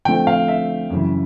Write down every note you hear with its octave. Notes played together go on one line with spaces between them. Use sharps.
D3 F3 A3 C4 G5
F5
E5
F#2 C#3 E3